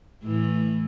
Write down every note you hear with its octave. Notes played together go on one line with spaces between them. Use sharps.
A2 E3